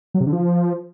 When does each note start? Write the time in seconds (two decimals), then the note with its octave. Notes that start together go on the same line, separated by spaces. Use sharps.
0.14 F#3
0.21 C3
0.27 D3
0.33 F3